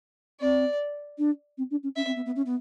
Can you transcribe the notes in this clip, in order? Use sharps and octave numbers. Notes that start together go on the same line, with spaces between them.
C4 D5
D4
C4
D4
C#4
C#4 E5
C4
B3
B3
C#4
B3